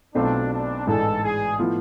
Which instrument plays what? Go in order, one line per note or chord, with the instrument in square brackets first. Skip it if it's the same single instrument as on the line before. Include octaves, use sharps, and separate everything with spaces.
[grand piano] B1 B2 A3 C4 F4 [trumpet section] D4
[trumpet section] D4
[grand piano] A1 G#2 E3 G#3 D4 [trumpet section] A4
[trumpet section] G#4
[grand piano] A2 F3 B3